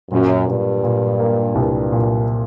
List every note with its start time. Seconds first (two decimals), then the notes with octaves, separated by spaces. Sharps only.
0.11 F#2 A#2
0.48 G2 A#2
0.84 A#2
1.19 A#3
1.55 C2
1.92 A#2